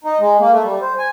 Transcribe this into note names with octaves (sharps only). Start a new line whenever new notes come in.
D#4
G#3
A#3
A3
G3
C5
G#5